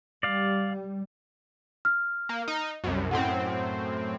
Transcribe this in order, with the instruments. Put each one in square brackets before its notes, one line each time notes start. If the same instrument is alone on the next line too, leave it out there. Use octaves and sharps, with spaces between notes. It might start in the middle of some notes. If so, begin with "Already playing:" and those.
[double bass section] G3 [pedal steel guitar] D5 F5
[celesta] F6
[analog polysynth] A#3
D#4
C2 F#2
[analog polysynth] F#2 A2 C4 [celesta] F#5